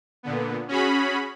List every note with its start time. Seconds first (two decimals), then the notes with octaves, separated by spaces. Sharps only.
0.23 A#2 D3 B3
0.68 C#4 F#4 G#4 B5